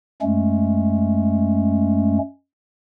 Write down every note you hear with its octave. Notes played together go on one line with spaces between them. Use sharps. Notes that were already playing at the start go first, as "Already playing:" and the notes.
F#2 G#3 A3 C#4